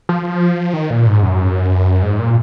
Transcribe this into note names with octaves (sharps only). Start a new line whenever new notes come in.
F3
D#3
A#2
G#2
F#2
G#2
A#2